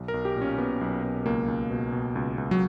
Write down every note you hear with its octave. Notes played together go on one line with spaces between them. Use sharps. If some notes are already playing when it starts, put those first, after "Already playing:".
Already playing: B1
A#4
B1
G4
A#2
C#4
A#2 B3
B1
B1
C#2 A#3
C#2
B2
B2
C#2
C#2
F#3